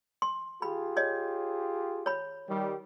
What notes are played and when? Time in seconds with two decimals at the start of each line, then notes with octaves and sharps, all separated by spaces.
0.22 C6
0.62 F4 G4 G#4 B5
0.97 C#5 D#5
2.06 C#5 B5
2.49 D#3 G3